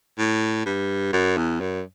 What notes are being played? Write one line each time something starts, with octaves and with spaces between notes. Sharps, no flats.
A2
G2
F#2
E2
F#2